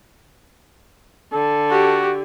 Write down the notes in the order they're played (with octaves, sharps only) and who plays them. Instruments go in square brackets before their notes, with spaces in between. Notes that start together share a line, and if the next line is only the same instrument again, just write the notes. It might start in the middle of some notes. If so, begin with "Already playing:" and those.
[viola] D3 [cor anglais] A4
[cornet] F#4 [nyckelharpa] G4